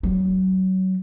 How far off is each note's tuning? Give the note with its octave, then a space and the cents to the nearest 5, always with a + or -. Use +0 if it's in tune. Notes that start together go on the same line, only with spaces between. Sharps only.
F#3 +25